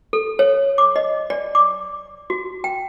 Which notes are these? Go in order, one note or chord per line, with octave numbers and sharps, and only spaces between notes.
A4
C#5
D6
D#5
D5
D6
F#4
G5